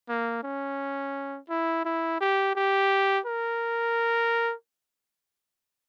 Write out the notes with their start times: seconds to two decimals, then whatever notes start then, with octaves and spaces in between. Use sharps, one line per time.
0.09 A#3
0.44 C#4
1.50 E4
1.85 E4
2.21 G4
2.56 G4
3.26 A#4